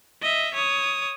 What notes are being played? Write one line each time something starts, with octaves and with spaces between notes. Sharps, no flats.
D#5 E5
C#5 D#6